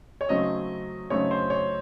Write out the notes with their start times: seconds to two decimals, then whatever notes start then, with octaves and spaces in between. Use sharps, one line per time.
0.21 C#5
0.29 C#3 F#3 A3 C4 D#4 D#5
1.10 C#3 F#3 A3 C4 D#4 C#5
1.31 C5
1.50 C#5